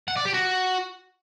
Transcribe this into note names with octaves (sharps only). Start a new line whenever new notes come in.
F#5
D5
G4
F#4